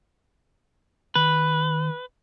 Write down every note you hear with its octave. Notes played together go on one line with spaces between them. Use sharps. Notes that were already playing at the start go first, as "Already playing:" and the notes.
D#3 B4